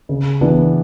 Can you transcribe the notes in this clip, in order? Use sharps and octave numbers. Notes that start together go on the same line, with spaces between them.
C#3
E3 B3 D4